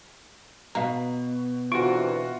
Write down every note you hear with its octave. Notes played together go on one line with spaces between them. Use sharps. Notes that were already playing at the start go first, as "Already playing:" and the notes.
B2 F5 A#5
D2 C3 E3 F4 F#4 C#6 D7